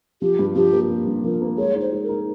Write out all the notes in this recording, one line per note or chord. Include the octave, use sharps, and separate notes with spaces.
F3 G4
G2
F3 G4
A#3
A#3
G2
F3 A#4
A#3
G#3 C#5
D#4
C5
G#3
A#4
D#4